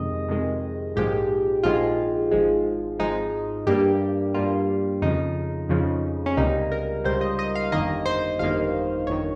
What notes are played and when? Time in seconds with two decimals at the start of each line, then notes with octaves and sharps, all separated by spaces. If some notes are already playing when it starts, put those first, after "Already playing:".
Already playing: F2 C3 D#3 G#3 D#5
0.28 F2 C3 D#3 G#3
0.96 A#1 G#2 F3 G#3 G4
1.63 A#1 G#2 F3 G#3 F4
2.31 G#1 G#2 F3 G#3
2.99 G#1 G#2 F3 G#3 D#4
3.67 G2 G3 A#3 G4
4.34 G2 G3 A#3 F4
5.02 F2 C#3 F3 D#4
5.69 F2 C#3 F3
6.26 C#4
6.37 C#2 C3 G3 A#3 D#4
6.72 A#4
7.04 C#2 C3 G3 A#3 C5
7.21 D#5
7.39 D#5
7.55 F5
7.72 G1 F2 D#3 A#3 D#5
8.06 C5
8.39 G1 F2 D#3 A#3 F5
9.07 G1 F2 D#3 C#5